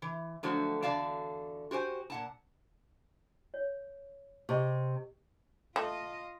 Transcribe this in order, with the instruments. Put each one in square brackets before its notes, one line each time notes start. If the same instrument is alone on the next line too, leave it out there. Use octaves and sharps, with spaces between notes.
[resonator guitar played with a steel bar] E3
D3 F3 F#3 A3 F#4
E2 D3 F#4 D5 F5 A5
F#4 G4 C5 G#5
A#2 F#5 A5
[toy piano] C#5
[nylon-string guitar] C3 [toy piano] G#4 D#5 C#6
[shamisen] A3 [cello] F4 D#5